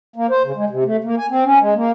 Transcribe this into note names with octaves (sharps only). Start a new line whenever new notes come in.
A#3
C5
C#3
G#3
C3
A3
A#3
G#5
C4
C#4
G#3
A#3